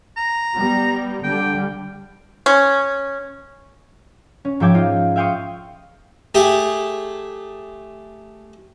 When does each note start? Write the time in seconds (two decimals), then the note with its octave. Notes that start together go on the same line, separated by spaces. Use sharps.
0.17 A#5
0.56 G3 B3
1.24 D3 G3 G5
2.46 C#4
4.45 C#4
4.60 G#2 F3 E5 G5 D6 G#6
4.74 D#4 F4
5.16 E5 F5 G5 C6 C#6 D#6
6.35 A3 G4 G#4